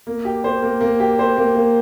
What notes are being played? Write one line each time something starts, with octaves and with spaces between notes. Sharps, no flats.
A#3
G4
C5
A#3
A#3
G4
C5
A#3
A#3